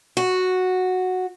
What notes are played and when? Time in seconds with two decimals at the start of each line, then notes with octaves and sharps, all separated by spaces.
0.17 F#4